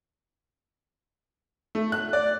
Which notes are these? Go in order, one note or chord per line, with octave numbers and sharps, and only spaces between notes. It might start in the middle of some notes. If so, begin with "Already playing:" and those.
A3
F#6
D5